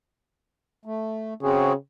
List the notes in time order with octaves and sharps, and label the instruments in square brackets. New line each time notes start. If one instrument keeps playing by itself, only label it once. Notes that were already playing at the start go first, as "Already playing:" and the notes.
[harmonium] A3
[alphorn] C#3 [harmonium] C4 F#4 G#4